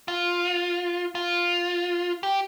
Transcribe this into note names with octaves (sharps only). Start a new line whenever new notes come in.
F4
F4
G4